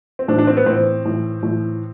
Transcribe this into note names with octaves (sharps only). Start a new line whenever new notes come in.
C4
A2 E3 D4
D4
C4
B3
A2 E3 C4
A2 E3
A2 E3